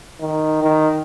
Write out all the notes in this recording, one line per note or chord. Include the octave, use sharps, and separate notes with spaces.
D#3
D#3